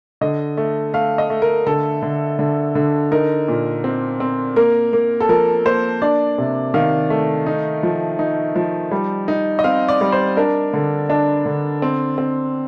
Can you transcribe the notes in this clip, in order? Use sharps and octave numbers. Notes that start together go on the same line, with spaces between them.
D3 D#5
A3
A3 F5
D#5
A3
A#4
D3 A4
D3
D3
D3
D#4 A#4
A#2
C4
C4
A#3 A#4
A#3
A4
F3 A#4
A#3 C5
D4 D5
C3
D#3 F5
A3
D#4
F3
D#4
F3
G3
D#4
D#5
C4 F5
D5
G3
C5
D4 A#4
D3
D4
D3
C4
C4